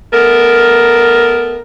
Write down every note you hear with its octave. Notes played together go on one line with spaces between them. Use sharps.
A3 B3 A#4